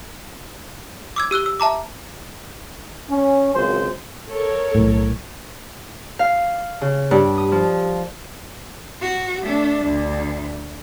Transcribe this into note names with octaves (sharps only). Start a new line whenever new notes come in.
D6 E6 G#6
G4 E6 F#6 G7
E6
E5 A5 A#5 D6
C#4
G#1 C#2 F#3 C5
A4 A#4 C#5
B1 A2
F5
C#3
G2
D#6
F3
F#4
A3 D4
D2